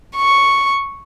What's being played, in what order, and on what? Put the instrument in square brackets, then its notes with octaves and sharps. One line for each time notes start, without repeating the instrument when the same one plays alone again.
[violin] C#6